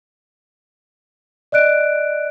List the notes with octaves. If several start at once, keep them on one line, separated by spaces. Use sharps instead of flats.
D5 D#5 F#6 D7